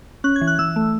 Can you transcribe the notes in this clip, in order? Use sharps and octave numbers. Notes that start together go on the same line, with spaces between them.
C#4 F#6
G#6
E3
F#6
E3 E6
A3